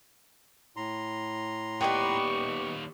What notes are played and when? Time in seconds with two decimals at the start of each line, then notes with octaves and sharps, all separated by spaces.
0.76 A2 A#5 C6
1.81 D#2 B3 G4 D5 D#5 G5 C#6